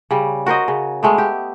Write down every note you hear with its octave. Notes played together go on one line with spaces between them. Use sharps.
C#3 G3
F#4 A#4 C5 D#5
C#3
G#3 A3 B3
G4